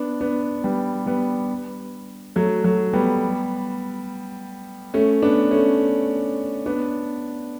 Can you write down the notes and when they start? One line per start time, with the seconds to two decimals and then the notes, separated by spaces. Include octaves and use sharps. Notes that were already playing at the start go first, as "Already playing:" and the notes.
Already playing: B3 D4
0.21 B3 D4
0.64 G3 B3
1.06 G3 B3
2.36 F#3 A3
2.64 F#3 A3
2.93 G3 B3
4.94 A3 C#4
5.22 B3 D4
5.51 A3 C#4
6.66 B3 D4